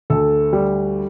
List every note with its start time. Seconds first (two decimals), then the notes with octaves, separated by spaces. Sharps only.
0.10 D2 A4
0.53 G3